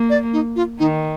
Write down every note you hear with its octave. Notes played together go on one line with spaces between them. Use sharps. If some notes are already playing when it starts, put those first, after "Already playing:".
Already playing: A#3
D5
D#4
F4
D#3 D#4